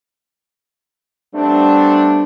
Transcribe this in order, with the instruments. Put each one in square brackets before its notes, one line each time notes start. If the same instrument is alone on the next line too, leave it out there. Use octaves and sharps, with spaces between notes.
[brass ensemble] G3 A3 B3 C4 D4